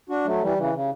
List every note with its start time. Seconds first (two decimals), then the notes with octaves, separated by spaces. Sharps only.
0.09 D4 F#4
0.25 F#3 A3
0.42 E3 G3
0.57 C#3 E3
0.73 C#3